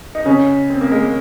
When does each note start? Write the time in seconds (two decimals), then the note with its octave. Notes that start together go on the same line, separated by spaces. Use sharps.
0.15 D#4
0.26 C#3 C#4
0.70 C4
0.81 A#3
0.92 G#3
1.02 A#3